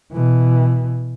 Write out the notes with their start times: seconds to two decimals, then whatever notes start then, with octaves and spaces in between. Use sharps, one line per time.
0.13 B2 E3